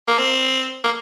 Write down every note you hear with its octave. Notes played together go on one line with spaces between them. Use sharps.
A#3
C4
A#3